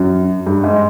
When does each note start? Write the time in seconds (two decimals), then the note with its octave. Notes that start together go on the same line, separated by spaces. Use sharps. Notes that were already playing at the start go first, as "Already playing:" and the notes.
Already playing: F#2
0.46 G2
0.64 G#2